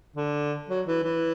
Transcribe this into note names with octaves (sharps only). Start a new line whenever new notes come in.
D3
F#3
E3
E3